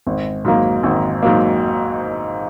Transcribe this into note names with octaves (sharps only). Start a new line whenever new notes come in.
G#1
G#2 F#3 A#3
G#1
G#2 F#3 A#3